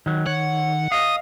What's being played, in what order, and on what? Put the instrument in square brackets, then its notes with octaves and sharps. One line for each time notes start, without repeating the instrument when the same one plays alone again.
[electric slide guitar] D#3 F#3
[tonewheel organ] D#3 [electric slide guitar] C#5 [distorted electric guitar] F#5
[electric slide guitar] D#5 F5 [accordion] D#6